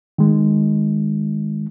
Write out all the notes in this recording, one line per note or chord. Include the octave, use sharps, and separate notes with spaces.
D#3 G#3